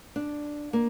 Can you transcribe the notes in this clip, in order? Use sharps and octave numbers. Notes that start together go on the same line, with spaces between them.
D4
A#3